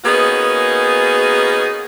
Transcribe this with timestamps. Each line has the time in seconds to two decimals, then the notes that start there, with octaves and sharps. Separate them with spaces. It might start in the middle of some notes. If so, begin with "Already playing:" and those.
0.05 A#3 B3 C#4 D#4 F#4 G#4